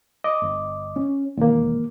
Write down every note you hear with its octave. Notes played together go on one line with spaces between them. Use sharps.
D#5 D6
G1
C#4
E1 D#2 A#3